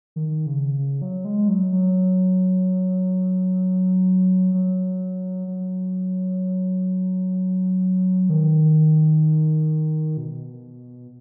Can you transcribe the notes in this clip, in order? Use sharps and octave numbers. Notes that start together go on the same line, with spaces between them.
D#3
C#3
C#3
F#3
G#3
F#3
F#3
F#3
F#3
D#3
B2